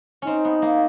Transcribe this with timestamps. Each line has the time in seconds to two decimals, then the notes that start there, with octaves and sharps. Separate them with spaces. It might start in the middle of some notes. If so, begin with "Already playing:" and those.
0.22 C4 C#4 D#4
0.45 B3
0.62 A#3